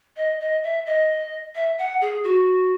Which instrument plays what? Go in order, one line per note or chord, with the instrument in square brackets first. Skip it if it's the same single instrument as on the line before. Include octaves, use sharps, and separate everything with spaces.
[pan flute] D#5
D#5
E5
D#5
E5
F#5
G#4
F#4